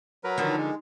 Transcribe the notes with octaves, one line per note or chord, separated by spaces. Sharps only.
F#3 A#4 B4
D3 D#3 F3
G#3